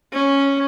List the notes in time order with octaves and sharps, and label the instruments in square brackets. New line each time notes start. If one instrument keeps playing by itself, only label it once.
[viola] C#4